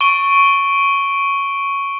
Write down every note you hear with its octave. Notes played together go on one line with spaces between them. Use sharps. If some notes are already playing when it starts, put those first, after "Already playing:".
C#6 D7 G7